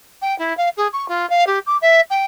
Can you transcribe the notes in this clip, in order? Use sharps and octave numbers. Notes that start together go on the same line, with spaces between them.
G5
E4
F5
G#4
C#6
F4
F5
G4
D6
E5
G5